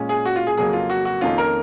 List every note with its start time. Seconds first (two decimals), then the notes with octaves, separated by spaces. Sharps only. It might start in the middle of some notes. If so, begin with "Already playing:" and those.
Already playing: A#2 G#3 C#4
0.09 G#4
0.25 F#4
0.36 F4
0.47 G#4
0.57 F2 C#3 F#3 A#3 G#4
0.73 F4
0.90 F#4
1.05 F#4
1.21 F2 D#3 A#3 C#4 F4
1.38 A#4